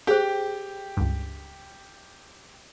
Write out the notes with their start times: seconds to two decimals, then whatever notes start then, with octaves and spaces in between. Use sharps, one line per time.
0.07 G4 G#4 C5 G5
0.97 C#2 G2